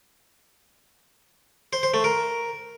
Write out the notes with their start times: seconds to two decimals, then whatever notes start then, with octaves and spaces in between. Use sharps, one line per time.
1.73 C5
1.83 C5
1.94 A3
2.04 A#4